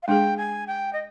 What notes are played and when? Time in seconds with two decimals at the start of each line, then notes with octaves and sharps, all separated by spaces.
0.03 F5
0.07 G#3 D4 G#4 G5
0.38 G#5
0.67 G5
0.93 D#5